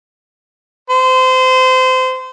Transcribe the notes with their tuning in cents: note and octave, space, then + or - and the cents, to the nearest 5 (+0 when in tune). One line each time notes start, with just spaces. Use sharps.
C5 -25